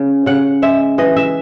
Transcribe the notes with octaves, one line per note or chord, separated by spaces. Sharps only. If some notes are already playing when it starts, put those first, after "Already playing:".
Already playing: C#3
C#3 F#5
G#3 E5
E3 D#5
E5